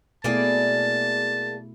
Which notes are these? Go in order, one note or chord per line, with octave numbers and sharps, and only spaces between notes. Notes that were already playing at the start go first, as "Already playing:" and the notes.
B2 A3 A#3 E4 G#4 D5 A5